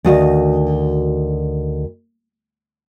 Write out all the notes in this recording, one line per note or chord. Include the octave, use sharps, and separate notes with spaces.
D2 D#3 F#4 D#5 F5